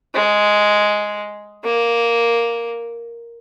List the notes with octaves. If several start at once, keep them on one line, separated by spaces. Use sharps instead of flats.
G#3
A#3